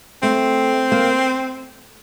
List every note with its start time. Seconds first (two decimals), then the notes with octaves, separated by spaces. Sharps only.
0.22 A3 C4
0.92 A#3